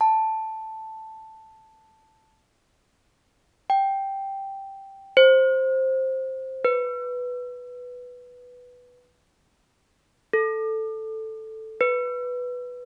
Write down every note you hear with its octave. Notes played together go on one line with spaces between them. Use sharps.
A5
G5
C5
B4
A4
B4